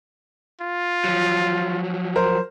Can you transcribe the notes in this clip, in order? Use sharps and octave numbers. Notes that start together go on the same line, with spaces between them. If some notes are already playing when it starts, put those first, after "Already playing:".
F4
F3 F#3
A#4 C5